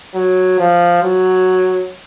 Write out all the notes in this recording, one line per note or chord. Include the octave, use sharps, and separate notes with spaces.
F#3
F3
F#3